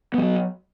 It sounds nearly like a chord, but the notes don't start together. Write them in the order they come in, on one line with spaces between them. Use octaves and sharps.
B3 G3 F#3